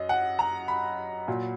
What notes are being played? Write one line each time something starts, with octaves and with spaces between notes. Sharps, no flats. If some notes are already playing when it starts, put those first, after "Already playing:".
Already playing: F#2 D#5
F#5
A#5
B5
A#2 F#3